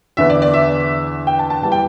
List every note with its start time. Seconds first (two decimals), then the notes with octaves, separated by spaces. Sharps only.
0.17 E2 D3 B3 E5
0.30 D5
0.42 D5
0.54 E5
1.27 G5
1.39 A5
1.50 A5
1.62 E2 E3 G3 A5
1.72 G5